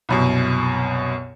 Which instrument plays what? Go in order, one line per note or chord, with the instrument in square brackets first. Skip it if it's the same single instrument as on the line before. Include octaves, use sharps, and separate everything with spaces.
[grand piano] C2 F#2 B2